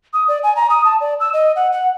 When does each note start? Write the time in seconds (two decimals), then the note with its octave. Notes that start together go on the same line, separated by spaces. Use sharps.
0.13 D#6
0.28 D5
0.43 G#5
0.56 A#5
0.70 D#6
0.85 A5
1.01 D5
1.20 E6
1.33 D#5
1.56 F#5
1.72 F#5